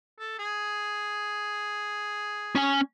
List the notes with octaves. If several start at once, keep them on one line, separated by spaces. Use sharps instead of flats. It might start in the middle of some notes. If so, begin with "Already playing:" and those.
A4
G#4
C#4 G#5